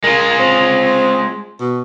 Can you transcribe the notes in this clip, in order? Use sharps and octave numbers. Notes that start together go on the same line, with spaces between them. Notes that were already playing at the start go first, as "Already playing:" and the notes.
G#3 F4 A#4
C4
B2